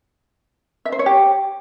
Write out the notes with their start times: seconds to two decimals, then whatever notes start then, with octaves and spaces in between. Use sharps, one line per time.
0.85 E5
0.92 C5
0.99 C#5
1.06 G4